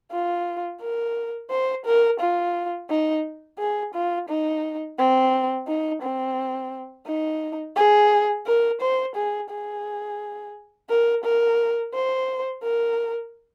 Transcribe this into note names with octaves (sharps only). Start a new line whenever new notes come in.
F4
A#4
C5
A#4
F4
D#4
G#4
F4
D#4
C4
D#4
C4
D#4
G#4
A#4
C5
G#4
G#4
A#4
A#4
C5
A#4